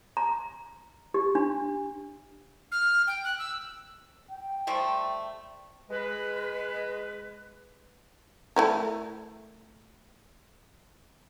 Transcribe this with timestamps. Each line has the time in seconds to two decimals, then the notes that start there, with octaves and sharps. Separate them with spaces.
0.17 A#5
1.14 G4
1.35 D4
2.72 F6
3.07 G5
3.24 F#6
3.39 E6
4.31 G5
4.67 F3 G3 A3
5.90 G#3 B4
8.56 A3 E4 A#4